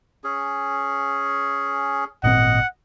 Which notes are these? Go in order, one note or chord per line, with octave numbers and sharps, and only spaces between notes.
C#4 G#4
G#1 A#2 C4 D#5 F#5